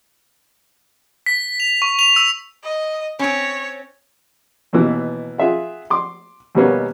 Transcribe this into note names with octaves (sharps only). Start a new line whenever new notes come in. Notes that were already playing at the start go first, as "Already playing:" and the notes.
B6
F7
C#6
F7
E6
D#5
C4 C#4 C#5
D#2 B2 E3 B3
F4 G#4 E5 F#5
C6 D6
D#2 B2 G3 A#3 B3 C#4